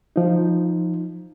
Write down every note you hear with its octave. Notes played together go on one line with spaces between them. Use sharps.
F3 D#4